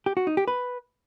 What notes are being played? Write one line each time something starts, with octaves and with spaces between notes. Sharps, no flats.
G4
F#4
D#4
G4
B4